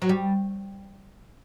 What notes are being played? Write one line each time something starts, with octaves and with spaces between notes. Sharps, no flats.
F#3
G3